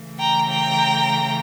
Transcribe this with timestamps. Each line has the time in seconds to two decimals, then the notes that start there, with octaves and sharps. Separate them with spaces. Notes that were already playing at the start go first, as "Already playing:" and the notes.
Already playing: C#3 E3 A3
0.18 G5 A#5
0.48 G5 A#5